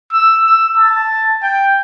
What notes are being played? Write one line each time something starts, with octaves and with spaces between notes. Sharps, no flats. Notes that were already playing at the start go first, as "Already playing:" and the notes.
E6
E6
A5
G5